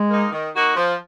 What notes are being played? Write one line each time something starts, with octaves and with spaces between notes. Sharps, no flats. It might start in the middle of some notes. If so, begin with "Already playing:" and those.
Already playing: G#3
A#3 D#4
D#3
A#3 D#4 F#4
F3